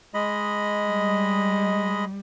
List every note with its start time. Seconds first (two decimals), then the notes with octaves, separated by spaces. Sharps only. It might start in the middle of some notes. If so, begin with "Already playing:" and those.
0.14 G#3 D#5 B5
0.86 G3